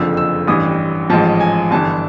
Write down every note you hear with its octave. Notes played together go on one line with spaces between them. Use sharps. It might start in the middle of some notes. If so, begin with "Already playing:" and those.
Already playing: F#1 F2 D3 F3 E6
E6
A1 G2 E3 D#6
A1 G#2 F3 A5
G#5
G1 G2 E3 A5